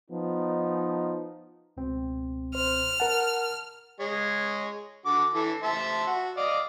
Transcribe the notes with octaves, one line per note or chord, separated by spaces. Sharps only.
F3 B3 D#4
C#2 B2 C4
C5 F6
A#4 F#5 A5
G#3 C#5
D3 F#4 D6
E3 A4
C5 E5 A5
F#4
D5 D#5 F5